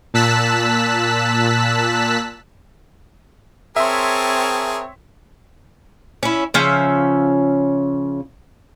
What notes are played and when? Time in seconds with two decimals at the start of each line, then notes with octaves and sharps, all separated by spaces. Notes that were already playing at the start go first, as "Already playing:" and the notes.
0.14 A#2 A5 E6 F#6 B6
3.76 C4 G#4 A#4 C#5 E5 A5 C6
6.23 C#4 E4
6.54 C#3 F3 C#4 E5